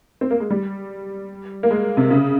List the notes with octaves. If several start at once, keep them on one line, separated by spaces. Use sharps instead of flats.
C4
A#3
G#3
G3
A#3
G#3
C3
C#3